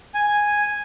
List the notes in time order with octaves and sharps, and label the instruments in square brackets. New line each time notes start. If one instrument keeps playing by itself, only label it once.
[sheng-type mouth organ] G#5